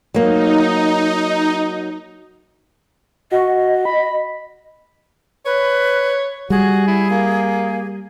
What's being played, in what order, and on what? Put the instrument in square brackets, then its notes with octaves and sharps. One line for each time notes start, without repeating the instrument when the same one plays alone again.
[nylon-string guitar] F#3 A#3 [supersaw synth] D#4
[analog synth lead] F#4 [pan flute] D#5
[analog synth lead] B5
[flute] B4 [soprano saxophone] C#5
[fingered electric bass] G3 [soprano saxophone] F#4 [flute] G#4
[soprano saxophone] E4
A#3